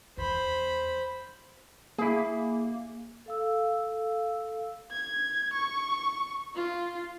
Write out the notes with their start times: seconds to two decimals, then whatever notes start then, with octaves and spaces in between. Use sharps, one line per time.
0.17 E2 C5 B5
1.98 A#3 E4 G#4
3.26 A4 F5 E6
4.92 G#6
5.54 C#6
6.56 F4